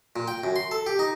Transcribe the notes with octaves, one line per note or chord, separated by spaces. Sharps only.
A#2
G5
F#2
C6
A4
G4
D#4